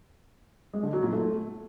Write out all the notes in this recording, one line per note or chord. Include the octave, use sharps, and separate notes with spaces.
G#3
D3
F#3
A#2
A3